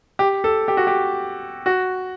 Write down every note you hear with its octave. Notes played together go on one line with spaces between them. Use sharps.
G4
A4
G4
F#4
G4
F#4